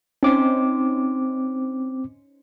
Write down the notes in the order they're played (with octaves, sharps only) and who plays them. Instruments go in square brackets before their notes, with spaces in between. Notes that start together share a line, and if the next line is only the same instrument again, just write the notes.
[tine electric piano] C4 D6 [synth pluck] C#4 D#4 C5